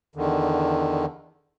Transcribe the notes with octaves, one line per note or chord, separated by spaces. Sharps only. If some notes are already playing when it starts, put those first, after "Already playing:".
E2 D3 D#3